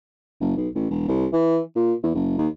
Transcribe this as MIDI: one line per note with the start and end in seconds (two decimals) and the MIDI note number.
0.41 0.56 30
0.57 0.68 35
0.75 0.87 33
0.90 1.04 28
1.08 1.26 36
1.33 1.60 52
1.76 1.93 46
2.03 2.10 40
2.15 2.34 30
2.38 2.48 39